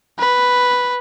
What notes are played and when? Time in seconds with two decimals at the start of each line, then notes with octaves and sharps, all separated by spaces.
0.19 B4